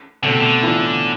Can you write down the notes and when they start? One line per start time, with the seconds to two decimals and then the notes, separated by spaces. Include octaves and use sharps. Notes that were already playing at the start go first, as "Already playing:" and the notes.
0.22 B2 D3 A3 C4
0.31 C3
0.40 D3
0.62 A2 E3 B3 D4 F4